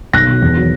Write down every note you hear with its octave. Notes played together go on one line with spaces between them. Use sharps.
B1 F#6 A#6
B2 F#3
E2
D#3 F#3